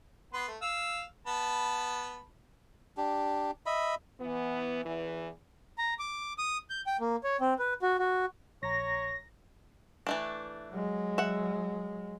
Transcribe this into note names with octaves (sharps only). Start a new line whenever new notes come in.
B3 B4 C6
A3
F5 E6
B3 A5 B5
D4 G4
D#5 E5 B5
E3 B3
E2 E3
A#5
D6
D#6
G6
G5
A#3
C#5
C4
B4
F#4
F#4
A#1 C#5 A#5 A#6
E3 A3 D4
F#3 G#3
E5 F#5